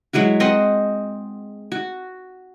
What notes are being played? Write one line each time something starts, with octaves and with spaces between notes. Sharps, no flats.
F#3 G#3 E4 F#4
C4 D#5 F#5 C6
F#4